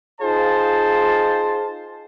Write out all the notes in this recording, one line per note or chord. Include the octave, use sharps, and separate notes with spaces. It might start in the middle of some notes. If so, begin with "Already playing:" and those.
D#4 F4 G#4 C5 F5 A5